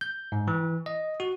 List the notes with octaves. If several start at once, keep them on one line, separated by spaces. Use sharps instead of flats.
G6
G#2
E3
D#5
F#4